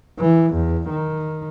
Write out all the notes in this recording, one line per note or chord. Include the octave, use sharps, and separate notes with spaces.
E3
E2
D#3